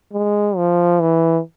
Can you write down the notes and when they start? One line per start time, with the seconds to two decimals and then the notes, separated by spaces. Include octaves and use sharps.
0.13 G#3
0.57 F3
1.00 E3